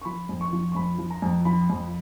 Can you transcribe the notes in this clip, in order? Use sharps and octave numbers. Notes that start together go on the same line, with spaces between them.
C#6
F3 B5
F2
C#6
F3
C#6
F2 B5
F3
A#5
F2
F3 B5
F2